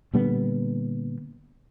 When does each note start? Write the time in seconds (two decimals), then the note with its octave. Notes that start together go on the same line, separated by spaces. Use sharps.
0.13 A#2 D3 G3 B3